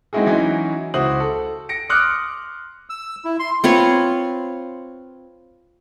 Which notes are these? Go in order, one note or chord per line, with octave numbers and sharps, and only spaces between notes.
G#3 C4 D#4 E4 F#4 G#4
E3 F#3 C#4 D#4 E4
C#2 E4 F#4 C5 D#6 F#7
A4
A#6 C#7 D7
C6 D6 D#6 F6 F#6 C#7
E6
E4
C6
C4 F4 B4 C#5